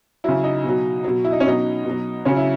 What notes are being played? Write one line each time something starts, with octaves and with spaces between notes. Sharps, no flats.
C#3 F#3 E4
D#4
B2 F#3
B2 F#3
E4
D#4
C#4
B2 F#3 D#4
B2 F#3
C#3 F#3 C#4
E4